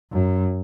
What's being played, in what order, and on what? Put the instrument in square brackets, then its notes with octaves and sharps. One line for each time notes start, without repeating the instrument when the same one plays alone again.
[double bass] F#2